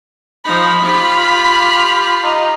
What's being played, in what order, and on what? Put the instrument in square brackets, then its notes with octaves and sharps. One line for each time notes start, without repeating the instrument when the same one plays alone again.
[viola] F3 D#4 [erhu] B5
[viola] F4 G4
[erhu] D#4